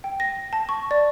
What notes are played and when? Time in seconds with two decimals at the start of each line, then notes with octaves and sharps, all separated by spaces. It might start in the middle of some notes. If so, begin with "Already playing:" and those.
0.04 G5
0.20 A#6
0.53 A5
0.69 C#6
0.91 D5